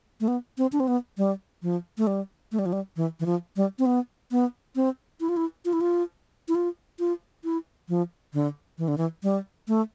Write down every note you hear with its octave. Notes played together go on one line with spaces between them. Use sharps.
A3
B3
C4
D4
C4
B3
G3
F3
A3
G3
A3
G3
F3
G3
E3
E3
F3
G3
C4
B3
B3
C4
E4
F4
E4
F4
E4
F4
E4
F4
F4
E4
F3
D3
E3
D3
E3
G3
A3